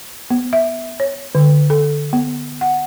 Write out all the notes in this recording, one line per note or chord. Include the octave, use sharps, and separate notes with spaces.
B3
E5
C#5
D3
A4
B3
F#5